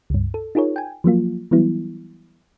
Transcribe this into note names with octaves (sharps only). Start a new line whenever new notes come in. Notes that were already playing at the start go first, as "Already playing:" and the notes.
C#2 G2
A4
D#4 F4 G#4 A#4 C#5
G5 G#5
F3 F#3 A#3 F4
E3 F#3 G3 B3 E4